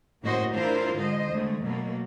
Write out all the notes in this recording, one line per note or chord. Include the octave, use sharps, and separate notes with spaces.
A2 C#3 A#3 F#4 C5 D#5
D4 E4 F4 A#4 C5
G#2 D3 G#3 C5 D#5
E2 D3 G#3 A3
B2 F#3 A3 A#3